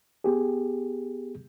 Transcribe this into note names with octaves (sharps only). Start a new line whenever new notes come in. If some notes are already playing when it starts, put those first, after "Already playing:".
B3 G4 G#4